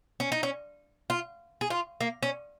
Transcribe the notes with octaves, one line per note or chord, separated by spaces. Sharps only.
C#4
D#4
C#4
F4
G#4
F4
A#3
C#4